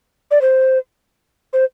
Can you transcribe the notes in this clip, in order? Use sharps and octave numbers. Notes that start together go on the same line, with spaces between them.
D5
C5
C5